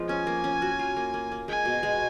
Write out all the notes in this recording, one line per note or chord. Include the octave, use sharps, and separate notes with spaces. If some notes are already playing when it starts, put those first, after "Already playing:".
Already playing: F3 G#3 B3
C#4 G#5
A#3
C#4
F#4
F4
A#3
A#3
A#3
G#3 G#5
B2
G#3